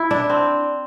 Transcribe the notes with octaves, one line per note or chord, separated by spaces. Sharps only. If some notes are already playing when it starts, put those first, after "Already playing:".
Already playing: E4
D4
C4